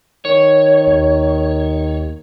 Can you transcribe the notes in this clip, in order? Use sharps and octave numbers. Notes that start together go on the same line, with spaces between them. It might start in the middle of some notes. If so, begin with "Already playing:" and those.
D#3 C#5
D#2